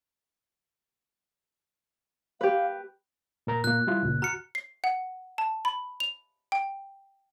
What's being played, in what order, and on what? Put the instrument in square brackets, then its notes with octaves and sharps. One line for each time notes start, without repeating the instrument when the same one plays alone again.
[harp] G4 B4 [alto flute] F5
[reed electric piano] A#2 A#4 A#5
[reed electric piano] A#2 A#3 [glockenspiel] F#6
[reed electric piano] G3 E4 F4
C#2 A#2
[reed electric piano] F#4 F6 [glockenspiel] A#5 C#7
[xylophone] C7
F#5
A5
B5
F7
G5